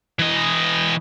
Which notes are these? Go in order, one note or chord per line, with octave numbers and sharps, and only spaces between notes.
E3 D#5